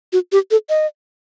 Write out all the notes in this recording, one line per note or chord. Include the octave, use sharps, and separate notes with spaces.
F#4
G4
A4
D#5